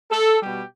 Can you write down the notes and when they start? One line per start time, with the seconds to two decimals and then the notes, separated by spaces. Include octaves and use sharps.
0.11 A4
0.40 B2 G3 G4